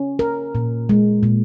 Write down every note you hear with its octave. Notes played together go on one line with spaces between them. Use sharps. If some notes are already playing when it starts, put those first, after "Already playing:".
Already playing: C#4
A#4
A#2
G#3
A#2